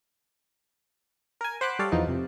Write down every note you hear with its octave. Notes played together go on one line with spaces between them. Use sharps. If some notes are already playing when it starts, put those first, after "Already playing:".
A#4 G#5
C5 F#5 B5 D6 F#6
G3 A4 C#5 D5 F5
E2 F3 B3 D#4
F2 C3